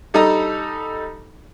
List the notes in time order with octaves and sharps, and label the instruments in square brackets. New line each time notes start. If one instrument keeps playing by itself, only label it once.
[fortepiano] G3 D#4 A4 D#5 A#5 D#6